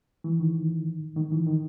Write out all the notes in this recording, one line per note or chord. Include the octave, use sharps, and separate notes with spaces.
E3
D#3
D#3
E3
D#3